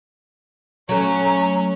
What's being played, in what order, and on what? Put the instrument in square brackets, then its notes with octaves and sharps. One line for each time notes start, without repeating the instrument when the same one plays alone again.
[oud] F#3 A3 [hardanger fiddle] C#4 [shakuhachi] A#5